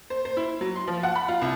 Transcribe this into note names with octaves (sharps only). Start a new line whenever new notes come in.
C5
C5
E4
F#3
C6
F3
F#5
B5
F4
C2